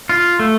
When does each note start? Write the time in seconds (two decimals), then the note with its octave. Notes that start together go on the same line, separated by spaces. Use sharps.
0.09 F4
0.40 A3